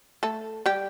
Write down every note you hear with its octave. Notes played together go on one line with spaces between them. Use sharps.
A3 A4
G3 G4